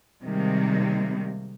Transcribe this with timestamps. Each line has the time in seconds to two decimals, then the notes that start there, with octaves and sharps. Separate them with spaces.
0.24 C3 D#3 G3 G#3 A#3